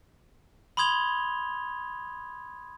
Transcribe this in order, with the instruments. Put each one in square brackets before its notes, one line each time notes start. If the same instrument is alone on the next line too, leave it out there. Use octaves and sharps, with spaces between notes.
[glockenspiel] B5 C6 D#6 G#6 F7 G7